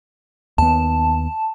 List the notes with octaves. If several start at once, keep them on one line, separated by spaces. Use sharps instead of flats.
D#2 B3 A5